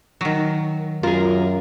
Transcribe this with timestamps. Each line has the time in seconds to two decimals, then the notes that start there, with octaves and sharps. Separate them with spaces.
0.21 D#3 F#3
1.03 F#2 F4 G#4 A#4